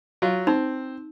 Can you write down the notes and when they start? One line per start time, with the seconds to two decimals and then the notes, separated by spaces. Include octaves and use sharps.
0.22 F#3 F4
0.47 C4 D#4